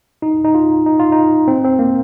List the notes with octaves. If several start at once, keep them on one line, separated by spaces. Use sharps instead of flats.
D#4
D#4
F4
D#4
F4
D#4
C4
C4
A#3